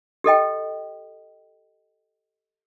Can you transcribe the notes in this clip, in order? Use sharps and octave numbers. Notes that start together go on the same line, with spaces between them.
G4 A4 D#5 G5